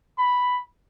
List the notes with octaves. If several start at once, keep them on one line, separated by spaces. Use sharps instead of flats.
B5